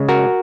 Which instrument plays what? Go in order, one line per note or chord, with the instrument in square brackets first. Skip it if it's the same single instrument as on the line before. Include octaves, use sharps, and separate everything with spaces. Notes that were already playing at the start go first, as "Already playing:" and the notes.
Already playing: [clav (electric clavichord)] C#3 G#3
F#4 A#4